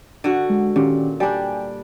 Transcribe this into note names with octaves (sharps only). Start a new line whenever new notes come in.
D3 F#4
G#3
A#2 D#3 C#4 G4
G3 D4 D5 G5 G#5